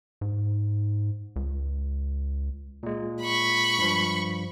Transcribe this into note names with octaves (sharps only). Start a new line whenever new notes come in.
G#2
C#2
A#2 G#3
B5 C#6
G2 F3